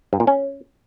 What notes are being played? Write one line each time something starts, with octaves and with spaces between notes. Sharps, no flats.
G2
A#2
C#4